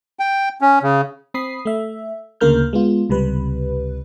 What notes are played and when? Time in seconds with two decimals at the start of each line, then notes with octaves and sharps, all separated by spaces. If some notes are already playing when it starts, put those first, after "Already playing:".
0.19 G5
0.61 C#4
0.83 C#3
1.34 C4 B5 D#6 C7
1.65 A3 E5
2.41 D2 C#3 A#3 A#4 F6 G6
2.73 G#3 B3 F4
3.09 C#2 C3 G3 B4